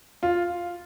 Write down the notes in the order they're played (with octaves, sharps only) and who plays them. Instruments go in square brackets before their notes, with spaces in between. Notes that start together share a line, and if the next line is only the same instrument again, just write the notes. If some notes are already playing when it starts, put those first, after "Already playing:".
[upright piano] F4